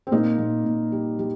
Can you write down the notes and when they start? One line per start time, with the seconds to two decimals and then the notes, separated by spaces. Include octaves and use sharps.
0.07 C4
0.11 A#2 A#3 D#4
0.38 A#2
0.65 A#2
0.92 G3
1.19 G3